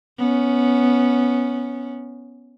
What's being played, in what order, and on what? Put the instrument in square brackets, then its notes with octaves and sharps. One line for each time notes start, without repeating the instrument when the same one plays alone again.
[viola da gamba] B3 C#4